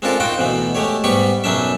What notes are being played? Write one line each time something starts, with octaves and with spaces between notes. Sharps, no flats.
G#3 C4 D4 F4 A4 A#4
D#4 F4 F#4 F#5 G5
D2 B2 E3 B3
G#3 A3 G4 C#5
G#2 G3 B3 G4 B5 C#6
B1 F#2 F#3 C#4 D4 E5